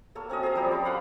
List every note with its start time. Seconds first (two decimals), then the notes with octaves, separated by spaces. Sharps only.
0.15 A#3 A4 C#5
0.30 C4 C#4 F#4 D#5
0.43 G#4 A4 E5 A#5
0.55 F3 G3 G4 C#5
0.71 C#4 B5 D6
0.84 A4 F5 F#5 B5